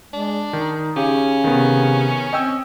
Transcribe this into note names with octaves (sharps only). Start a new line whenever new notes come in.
G#3 D4
D#3 D#4
C#3 C#4 G4
C3 D#3 B3
C4 D#5 G5 E6